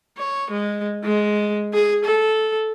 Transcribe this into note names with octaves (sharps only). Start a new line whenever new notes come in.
C#5
G#3
G#3
G#4
A4